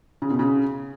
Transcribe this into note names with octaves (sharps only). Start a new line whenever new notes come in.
C#3
B2
C#3